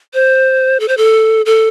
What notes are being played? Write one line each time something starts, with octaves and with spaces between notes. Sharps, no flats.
C5
A4
C5
A4
A4